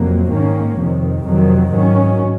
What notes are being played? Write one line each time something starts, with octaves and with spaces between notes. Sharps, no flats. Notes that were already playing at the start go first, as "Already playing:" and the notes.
Already playing: F2 C3 F#3 A#3
G#2 D#3 A#3 C#4
F2 C3 D#3
F2 C3 D#3 F#3
G#2 D#3 F#3 C#4